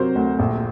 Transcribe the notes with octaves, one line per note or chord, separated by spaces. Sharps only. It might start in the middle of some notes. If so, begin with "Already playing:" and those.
Already playing: C3 F#3 A#4 C5
D2
A#1